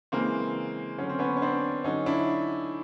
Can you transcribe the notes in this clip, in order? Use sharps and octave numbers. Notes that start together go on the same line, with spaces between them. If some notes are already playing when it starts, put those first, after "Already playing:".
C#3 E3 G#3 A#3 C4
D3 F#3 C#4
C4
B3 C#4
C#4
C4 D4
D3 F#3 C#4 D#4
D4 E4